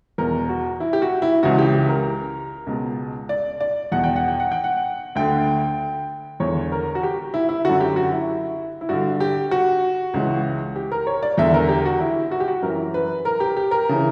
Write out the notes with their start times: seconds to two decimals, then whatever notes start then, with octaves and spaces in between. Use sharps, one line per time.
0.18 E2 B2 A#4
0.49 F#4
0.80 E4
0.93 G4
1.02 F#4
1.22 E4
1.43 C#2 C#3 E3 F#4
1.58 G4
1.74 G4
1.89 A#4
2.67 C#2 B2
3.29 D5
3.61 D5
3.92 E2 B2 F#5
4.04 G5
4.16 F#5
4.28 G5
4.40 F#5
4.52 G5
4.64 F#5
5.15 D2 D3 G5
6.40 E2 D3 C#5
6.72 A#4
6.95 F#4
7.03 G4
7.34 E4
7.49 E4
7.65 F#2 D3 F#4
7.80 G4
7.96 F#4
8.12 E4
8.81 E4
8.89 G2 D3 F#4
9.20 G4
9.51 F#4
10.14 C#2 C#3 E3
10.76 G4
10.91 A#4
11.07 C#5
11.23 D5
11.38 E2 D3 E5
11.54 A#4
11.69 G4
11.85 F#4
12.01 E4
12.31 F#4
12.40 G4
12.48 F#4
12.62 F#2 E3 A#4
12.94 B4
13.25 A#4
13.40 G4
13.56 G4
13.71 A#4
13.89 C#3 E3